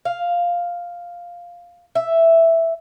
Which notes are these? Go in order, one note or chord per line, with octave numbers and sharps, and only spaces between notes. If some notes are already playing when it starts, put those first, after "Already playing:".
F5
E5